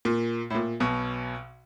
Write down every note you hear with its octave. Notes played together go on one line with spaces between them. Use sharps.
A#2
A2
A#2
B1 B2